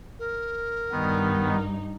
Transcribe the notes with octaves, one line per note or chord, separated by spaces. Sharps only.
A#4
G2 D#3 B3 D#4